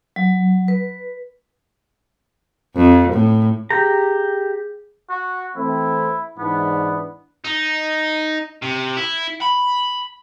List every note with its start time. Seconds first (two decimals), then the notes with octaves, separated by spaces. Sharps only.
0.16 F#3
0.68 B4
2.76 F2
3.13 A2
3.70 G4 G#4 A#5 G6
5.10 F#4
5.56 E3 A3 C4 E4
6.38 G#2 E3 B3 D4
7.45 D#4
8.62 C3
8.97 E4
9.41 B5